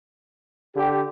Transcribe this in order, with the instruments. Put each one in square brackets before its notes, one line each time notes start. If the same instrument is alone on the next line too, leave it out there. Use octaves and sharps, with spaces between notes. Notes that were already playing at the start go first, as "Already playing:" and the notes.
[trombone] D3 [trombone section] G4